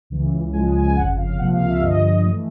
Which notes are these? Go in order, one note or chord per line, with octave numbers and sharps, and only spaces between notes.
C#2 C#3 E3
C#2 C#3 F3 G#3 G#5
G#5
G#5
G1 F2 C#3 F#5
F5
C#2 C3 F3 A#3 F#5
F5
E5
G2 D3 F3 D#5
E3 A3